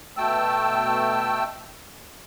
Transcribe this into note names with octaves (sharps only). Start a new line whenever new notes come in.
B2 A3 G5 A5 E6